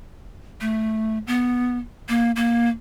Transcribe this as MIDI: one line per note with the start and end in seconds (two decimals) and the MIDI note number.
0.61 1.18 57
1.27 1.78 59
2.09 2.32 58
2.36 2.69 58